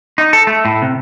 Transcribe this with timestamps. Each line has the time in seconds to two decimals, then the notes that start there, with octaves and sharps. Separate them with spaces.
0.18 D#4
0.33 A4
0.47 A3
0.65 A2
0.82 C3